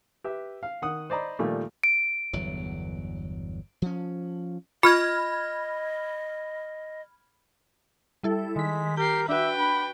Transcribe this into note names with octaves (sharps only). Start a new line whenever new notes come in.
G4 B4 E5
F5
D#3 F#5 D#6
C5 D5 D#5 A#5 B5
A#2 D#3 F3 G3 A3
D7
G1 E2 F#3
F3 C#4
F4 D#5 B5 F6 G#6
G3 E4 A4
D#3 G#3 B6
G4 A#4 G6 C7
D4 F#4 B4 E5 G5
B5